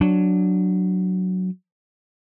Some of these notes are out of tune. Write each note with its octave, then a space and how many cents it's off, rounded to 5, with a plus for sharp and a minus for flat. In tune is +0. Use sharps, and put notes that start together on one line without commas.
F#3 +0 D4 +0